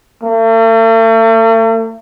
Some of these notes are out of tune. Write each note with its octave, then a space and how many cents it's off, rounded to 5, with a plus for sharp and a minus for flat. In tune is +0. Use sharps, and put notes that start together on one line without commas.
A3 +45